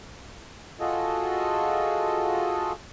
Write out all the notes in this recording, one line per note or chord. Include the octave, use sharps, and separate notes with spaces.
F4 F#4 G#4 A4 D#5